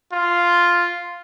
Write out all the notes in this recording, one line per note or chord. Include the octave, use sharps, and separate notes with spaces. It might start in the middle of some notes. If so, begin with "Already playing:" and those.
F4